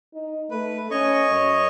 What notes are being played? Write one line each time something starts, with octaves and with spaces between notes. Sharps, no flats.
D#4
A3 B4
C#4 C#5 D#5 C#6
F#2